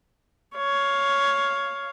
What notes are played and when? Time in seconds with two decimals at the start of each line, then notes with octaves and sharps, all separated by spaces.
0.57 C#5 F5